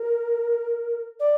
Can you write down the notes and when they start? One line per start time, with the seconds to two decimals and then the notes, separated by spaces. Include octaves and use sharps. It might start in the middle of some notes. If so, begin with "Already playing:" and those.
Already playing: A#4
1.20 D5